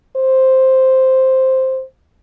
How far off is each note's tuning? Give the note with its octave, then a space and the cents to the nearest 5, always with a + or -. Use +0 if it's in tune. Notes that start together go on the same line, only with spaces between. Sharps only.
C5 +0